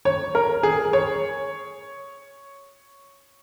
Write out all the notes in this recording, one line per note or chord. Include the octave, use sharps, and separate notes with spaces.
C#5
A#4
G#4
C#5